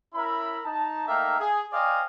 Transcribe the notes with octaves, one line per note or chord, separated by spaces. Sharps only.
C#4 E4 A#4 E5 B5
D#4 A5
A3 A#3 D#4 E5 F5 G5
G#4
C5 D5 D#5 F5 G5 G#5